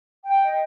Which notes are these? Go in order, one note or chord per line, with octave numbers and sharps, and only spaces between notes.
G5
D#5